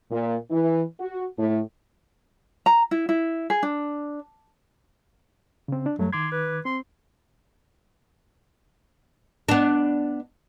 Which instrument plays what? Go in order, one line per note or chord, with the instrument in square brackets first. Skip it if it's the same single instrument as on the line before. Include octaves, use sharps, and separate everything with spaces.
[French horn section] A#2
E3
F#4
A2
[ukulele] A#5
E4
E4
G#4
D4
[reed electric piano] C#3 C4
D4
[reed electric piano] F#2 G3 A3 [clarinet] F#3
[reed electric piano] D#3 D6 G#6 [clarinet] C6
[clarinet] B4
[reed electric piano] C4 [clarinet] C6
[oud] B3 D4